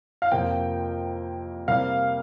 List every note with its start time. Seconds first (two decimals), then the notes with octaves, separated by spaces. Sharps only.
0.22 F5
0.32 F2 C3 F3 A#3 G5
1.68 C3 G3 A#3 F5